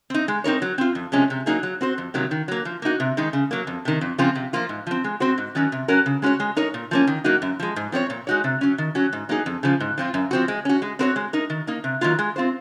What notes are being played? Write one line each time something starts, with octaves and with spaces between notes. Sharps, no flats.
C4 D#4
G#3
C4 D#4 A#4 C#5
F#3
C4 F4
F2
C3 F3 G#3 C#4
C3
F#3 A#3 D#4 G#4
F#3
C4 F#4 C5
F2
C3 D#3 F#3 A#3
D#3
F#3 A#3
F3
A#3 D#4 F#4
C3
D#3 G#3 D#4
C#3
F#3 A#3
F2
C3 D#3
F2
C#3 F3 C4 F4
C3
F3 A#3 F4
G#2
F3 C4
G#3
C4 F#4 C5
G#2
D#3 F#3 C#4 F#4
C3
F#3 C#4 F#4 A#4
C#3
G#3 C#4 F#4 C#5
G#3
D#4 A#4 C#5
A#2
F3 A#3 C#4
D#3
F#3 A#3 D#4 F#4
F#2
F3 G#3
G#2
F3 C4 F#4 C#5
A#2
G#3 D#4 F#4 C#5
C3
F#3 C#4
D#3
F#3 C#4 F#4
G#2
F#3 A#3 D#4 G#4
F2
C#3 F3
G#2
F3 C4 F4
F#2
F3 C4 F#4
G#3
C#4 F#4
G#3
C4 F#4 A#4 C#5
G#3
D#4 A#4
D#3
A#3 D#4
C3
D#3 F#3 A#3 F4
G#3
C4 F4 C5